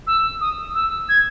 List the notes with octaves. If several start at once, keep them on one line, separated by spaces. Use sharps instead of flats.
E6
D#6
E6
G#6